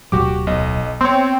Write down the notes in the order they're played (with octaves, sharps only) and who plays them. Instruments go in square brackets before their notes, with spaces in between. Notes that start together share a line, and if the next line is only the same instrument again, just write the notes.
[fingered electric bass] D1 B2 F#3 [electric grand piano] F#4 G4 D6
[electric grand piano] B1 D#5
[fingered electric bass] B3 [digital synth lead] C4 [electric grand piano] C#5 C6